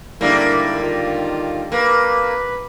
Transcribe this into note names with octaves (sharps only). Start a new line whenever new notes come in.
G#2 D3 D#3 G3 A#3 E4
D#3 F4
A#3 B4